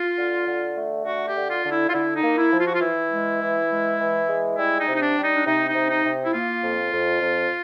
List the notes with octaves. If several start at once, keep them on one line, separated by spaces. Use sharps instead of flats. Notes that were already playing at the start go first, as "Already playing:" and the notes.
Already playing: F4
D3
D3
A3
D3 F#4
G4
D3
F4
D3
E4
F4
D3 E4
D#4
A#3
E4
F3
F4
F#4
F4
E3 E4
G#3
E3
G#3
E3
G#3
G3 E4
D#4
C3
D#4
D4
G3
D#4
D4
C3 D#4
D#4
C3
D#4
C3
E4
A#3 F4
F2
F2
F2